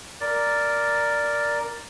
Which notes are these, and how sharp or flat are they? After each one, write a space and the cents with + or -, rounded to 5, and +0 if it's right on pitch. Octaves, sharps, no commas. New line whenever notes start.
A#4 +0 D5 +0